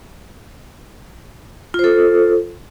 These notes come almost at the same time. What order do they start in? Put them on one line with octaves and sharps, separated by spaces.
F4 C5 A4